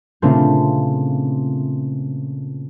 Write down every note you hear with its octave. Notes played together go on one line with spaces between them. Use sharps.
A#2 C#3 A3 C4 D4 F4